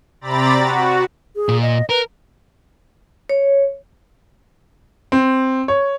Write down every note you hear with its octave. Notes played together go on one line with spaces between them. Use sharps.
C3 C4 D5 A#5 B5 A6
F#4
G#4
A#2
D#5
A#4 B4
C#5
C4
C#5